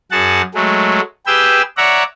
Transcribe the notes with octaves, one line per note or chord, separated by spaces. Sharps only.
F#2 F#4 G#4 F#5 A5
F#3 G#3 A3
G4 G#4 B4 G5 E6
C#5 D5 E5 F#5 A#5